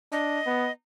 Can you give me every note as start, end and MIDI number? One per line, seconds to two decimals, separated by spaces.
0.12 0.40 62
0.12 0.71 75
0.46 0.69 59